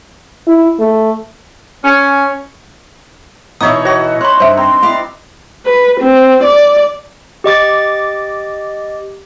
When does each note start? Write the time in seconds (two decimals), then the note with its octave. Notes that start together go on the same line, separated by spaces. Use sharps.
0.47 E4
0.80 A3
1.84 C#4
3.61 B2 E3 B3 D#4 C#5 E5 D#6
3.85 F#4 C#5 D#5 A#6
4.21 C#5 B5 C6 F#6
4.40 G2 C5 E5
4.57 C4 A#5 C6
4.82 E4 D5 F5
5.65 B4
6.00 C4
6.44 D5
7.44 G4 D#5 D6 A6